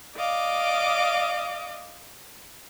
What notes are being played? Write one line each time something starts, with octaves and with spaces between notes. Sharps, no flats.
D5 D#5 F5 D6